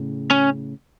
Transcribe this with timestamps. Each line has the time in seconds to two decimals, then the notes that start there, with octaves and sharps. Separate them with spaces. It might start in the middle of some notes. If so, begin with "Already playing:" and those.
Already playing: A2 C#3
0.31 C#4